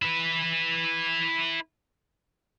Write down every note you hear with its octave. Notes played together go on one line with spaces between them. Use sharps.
E4 B4